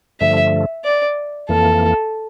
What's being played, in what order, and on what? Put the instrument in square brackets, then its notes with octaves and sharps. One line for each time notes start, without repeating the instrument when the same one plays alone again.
[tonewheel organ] G2 D3 F3 A3 [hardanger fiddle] E5
[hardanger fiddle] D5
[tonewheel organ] F2 E3 A#3 [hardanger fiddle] A4